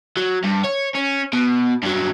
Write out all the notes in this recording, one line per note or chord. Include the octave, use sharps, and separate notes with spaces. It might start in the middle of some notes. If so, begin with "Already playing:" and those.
F#3
G2
C#5
C#4
B2
G2 F#3